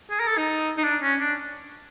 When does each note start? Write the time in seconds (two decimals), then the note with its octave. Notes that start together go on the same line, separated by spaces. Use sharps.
0.10 G#4
0.20 A#4
0.28 A4
0.38 D#4
0.77 D#4
0.84 D4
1.02 C#4
1.20 D4